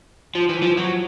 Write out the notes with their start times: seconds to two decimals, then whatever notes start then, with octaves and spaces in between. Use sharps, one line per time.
0.35 F3
0.49 E3
0.63 F3
0.77 F#3